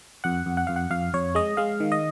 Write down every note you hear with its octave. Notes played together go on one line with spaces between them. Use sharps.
F2 F#5
F2
F#5
F2 F5
F#5
F2 F5
F2 C#5
G#3 D#5
G#3 F5
D#3
D#5